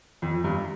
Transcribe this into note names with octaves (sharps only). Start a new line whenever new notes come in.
F2
G2